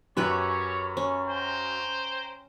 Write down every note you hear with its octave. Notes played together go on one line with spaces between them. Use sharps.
F#2 C#4 G4 B4 C#5 E5
C#4
C5 G5 A#5